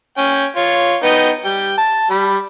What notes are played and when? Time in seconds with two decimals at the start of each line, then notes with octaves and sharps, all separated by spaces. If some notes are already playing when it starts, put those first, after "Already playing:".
0.18 C#4 G5 G#5
0.56 F4 C#5
1.03 B3 D#4 G5
1.45 G3 G5
1.78 A5
2.10 G3 B5